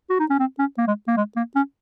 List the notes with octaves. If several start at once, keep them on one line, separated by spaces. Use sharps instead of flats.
F#4
D#4
C#4
C4
C#4
A#3
G#3
A#3
G#3
A#3
C#4